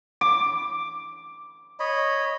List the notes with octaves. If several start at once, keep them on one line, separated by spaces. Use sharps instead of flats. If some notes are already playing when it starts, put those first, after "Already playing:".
D6
C#5 D#5 B5